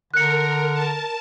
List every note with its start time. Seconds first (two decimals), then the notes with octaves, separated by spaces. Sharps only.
0.14 D3 A#4 F#6 C#7
0.74 A5